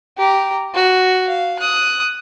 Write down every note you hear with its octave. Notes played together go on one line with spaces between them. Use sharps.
G4 A#5
F#4
F5
D#6 F#6